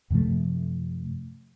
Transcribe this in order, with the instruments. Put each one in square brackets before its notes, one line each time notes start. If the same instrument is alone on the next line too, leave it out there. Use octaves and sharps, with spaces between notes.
[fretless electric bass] F#2 C3 F3 A3